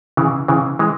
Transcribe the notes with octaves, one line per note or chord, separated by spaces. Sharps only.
C#3 E3
C#3 E3
E3 G#3